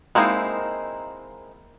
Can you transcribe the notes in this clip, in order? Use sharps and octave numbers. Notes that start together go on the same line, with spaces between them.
G#3 A#3 C4 D#4 E4